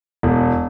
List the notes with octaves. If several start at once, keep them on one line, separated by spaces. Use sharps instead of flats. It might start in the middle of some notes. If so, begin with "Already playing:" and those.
E1